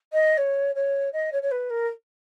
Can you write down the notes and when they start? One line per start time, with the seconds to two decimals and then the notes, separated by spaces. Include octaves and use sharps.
0.13 D#5
0.38 C#5
0.75 C#5
1.13 D#5
1.32 C#5
1.42 C#5
1.51 B4
1.70 A#4